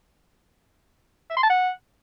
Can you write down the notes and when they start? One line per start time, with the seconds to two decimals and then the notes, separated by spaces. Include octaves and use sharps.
1.30 E5
1.37 C6
1.43 A5
1.50 F#5